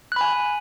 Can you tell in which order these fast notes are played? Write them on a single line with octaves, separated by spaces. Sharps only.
F#6 B5 G#5